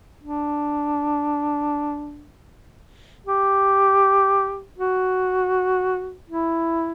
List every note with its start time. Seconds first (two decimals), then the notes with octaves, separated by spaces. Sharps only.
0.22 D4
3.27 G4
4.78 F#4
6.30 E4